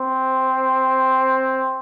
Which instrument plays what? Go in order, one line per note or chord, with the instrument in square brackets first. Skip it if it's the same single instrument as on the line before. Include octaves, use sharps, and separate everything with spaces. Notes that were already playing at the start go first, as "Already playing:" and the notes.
Already playing: [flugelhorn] C4